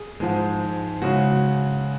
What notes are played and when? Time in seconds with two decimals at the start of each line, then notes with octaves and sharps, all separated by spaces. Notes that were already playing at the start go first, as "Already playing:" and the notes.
Already playing: G#4
0.20 G#2 F3 G#3
1.01 C#3 G#3 F#4